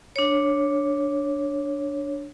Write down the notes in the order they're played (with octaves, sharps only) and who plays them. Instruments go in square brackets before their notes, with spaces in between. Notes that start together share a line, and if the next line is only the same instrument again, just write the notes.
[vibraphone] D4 C#5